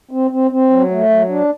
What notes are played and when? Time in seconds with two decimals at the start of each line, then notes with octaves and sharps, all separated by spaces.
0.11 C4
0.31 C4
0.51 C4
0.70 F#3
0.91 A3
1.09 F#3
1.30 D4